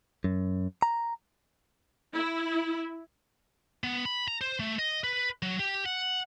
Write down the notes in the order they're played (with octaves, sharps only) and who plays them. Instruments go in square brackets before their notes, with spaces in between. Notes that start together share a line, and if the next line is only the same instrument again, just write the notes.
[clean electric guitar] F#2
A#5
[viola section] E4
[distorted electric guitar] B3
B5
A#5
C5
A3
D#5
B4
F#3
G4
F#5